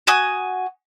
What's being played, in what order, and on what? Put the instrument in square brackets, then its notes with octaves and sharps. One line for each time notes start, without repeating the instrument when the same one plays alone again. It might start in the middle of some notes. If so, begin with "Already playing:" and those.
[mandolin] F#4 G#5 D#6